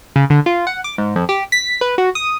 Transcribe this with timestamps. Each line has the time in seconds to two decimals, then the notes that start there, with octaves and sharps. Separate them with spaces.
0.16 C#3
0.30 D3
0.46 F4
0.67 F#5
0.84 D6
0.98 G#2
1.16 F2
1.29 G4
1.52 B6
1.81 B4
1.98 F#4
2.15 D#6